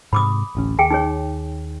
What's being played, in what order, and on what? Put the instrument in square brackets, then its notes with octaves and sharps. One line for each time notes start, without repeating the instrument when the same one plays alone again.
[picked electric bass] G#2 C3 [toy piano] B5 D6 D#6
[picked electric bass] D1 A1 C#4
[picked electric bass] D#2 [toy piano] G#4 G5 G#5
[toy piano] D#4 G#4 C#5